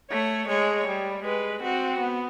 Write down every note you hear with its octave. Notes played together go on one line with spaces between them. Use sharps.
A3 C#5
G#3 C#5
G3
G#3 B4
C4 F#4
B3